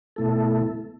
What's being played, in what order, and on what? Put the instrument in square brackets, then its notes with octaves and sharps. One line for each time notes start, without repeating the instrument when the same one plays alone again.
[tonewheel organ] B2 A3 E4 A4